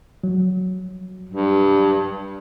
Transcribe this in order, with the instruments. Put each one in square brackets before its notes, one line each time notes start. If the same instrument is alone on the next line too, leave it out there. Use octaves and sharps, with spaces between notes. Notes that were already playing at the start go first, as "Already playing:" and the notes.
[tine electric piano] F#3
[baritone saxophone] G2